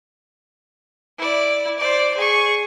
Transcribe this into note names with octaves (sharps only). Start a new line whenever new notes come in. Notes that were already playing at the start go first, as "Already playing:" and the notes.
E4 D5
C5 D5
G#4 C#6